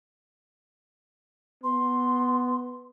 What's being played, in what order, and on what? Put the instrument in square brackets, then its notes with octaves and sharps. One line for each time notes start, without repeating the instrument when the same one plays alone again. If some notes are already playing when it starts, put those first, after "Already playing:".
[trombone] B3 [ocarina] C6